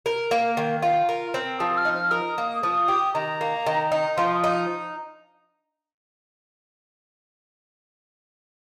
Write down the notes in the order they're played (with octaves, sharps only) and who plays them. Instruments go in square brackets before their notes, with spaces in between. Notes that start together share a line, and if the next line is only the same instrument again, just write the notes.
[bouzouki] A#4
A#3
D#3
F4
A#4
C4
[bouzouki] F3 [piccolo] D#6
[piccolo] F6
[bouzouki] D#4
[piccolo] F6
[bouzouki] A#4 [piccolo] D#6
[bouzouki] A#3
[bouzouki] F3 [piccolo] D#6
[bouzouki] G4
[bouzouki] D#3 [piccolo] A#5
[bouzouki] A#3
D#3
D#4
[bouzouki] F3 [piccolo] C6
[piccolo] D#6
[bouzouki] D#4